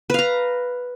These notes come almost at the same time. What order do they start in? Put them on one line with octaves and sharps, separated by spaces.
B4 F5 A#5